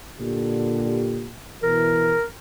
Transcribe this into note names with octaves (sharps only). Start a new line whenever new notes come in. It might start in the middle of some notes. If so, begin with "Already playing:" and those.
A#2 D3 G4
B2 E3 A#4